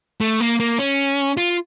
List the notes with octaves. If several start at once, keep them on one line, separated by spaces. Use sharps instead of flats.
A3
A#3
A#3
C#4
F4